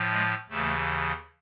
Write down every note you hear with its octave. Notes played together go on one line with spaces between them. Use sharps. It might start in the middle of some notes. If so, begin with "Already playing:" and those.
Already playing: A2 F3
G#3
D#2 C#3 E3 A3